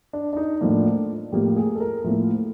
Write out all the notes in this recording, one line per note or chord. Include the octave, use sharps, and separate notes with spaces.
D4
D4
D#4
A2 F3 A#3 D4
A2 F3 A#3 G4
G#4
A4
A#4
A2 F3 A#3 E4